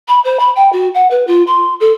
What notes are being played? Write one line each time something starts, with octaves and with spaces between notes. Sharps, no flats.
B5
C5
B5
G5
F#4
F#5
B4
F4
C6
A4